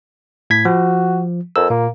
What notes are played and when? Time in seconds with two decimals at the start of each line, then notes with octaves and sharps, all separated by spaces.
0.50 A2 G#6 B6
0.65 F3 F#4
1.56 F2 A#4 E6
1.70 A#2 A#3